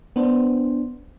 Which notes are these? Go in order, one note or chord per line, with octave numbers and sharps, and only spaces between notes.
B3 D4 C5